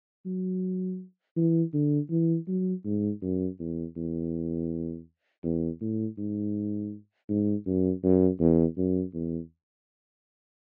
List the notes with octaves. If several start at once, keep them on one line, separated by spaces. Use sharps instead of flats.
F#3
E3
D3
E3
F#3
G#2
F#2
E2
E2
E2
A2
G#2
G#2
F#2
F#2
E2
F#2
E2